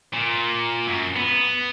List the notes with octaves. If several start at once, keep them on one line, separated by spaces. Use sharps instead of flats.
A#2
F#2
B3